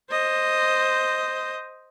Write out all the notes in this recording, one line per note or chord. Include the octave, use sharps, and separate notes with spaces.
C5 D#5